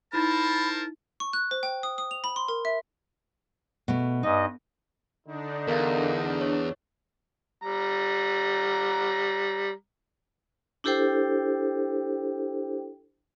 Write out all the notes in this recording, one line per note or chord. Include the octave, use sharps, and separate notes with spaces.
D#4 E4 A#4 C5 A5 B5
C#6
F#6
C5
G5
D#6
D#6
F7
B5
C6
A#4
E5
B2 A3
G2 D#4 D#5
D3 D4 D#4
E2 A#4 F5
C#5
G3 A#5
D4 E4 G4 A4 C5 G5